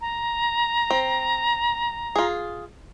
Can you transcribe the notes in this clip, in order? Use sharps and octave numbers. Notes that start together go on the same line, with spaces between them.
A#5
C4
F4 G#4